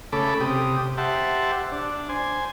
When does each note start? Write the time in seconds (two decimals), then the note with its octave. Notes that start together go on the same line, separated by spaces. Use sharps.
0.12 C#3 A3 A4 B5 D6
0.40 C3 G4 D#6
0.98 G4 C5 E5 F#5 A5
1.72 D4
2.09 C5 G#5